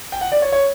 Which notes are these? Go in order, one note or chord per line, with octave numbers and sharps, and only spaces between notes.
G5
F#5
D5
C#5
C#5